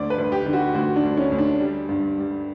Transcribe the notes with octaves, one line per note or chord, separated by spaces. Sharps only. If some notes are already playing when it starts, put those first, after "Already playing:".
Already playing: D2 D5
B4
D2
G4
D3
F#4
D2 F#4
D4
D2
C#4
D2
D4
G3
G2
G3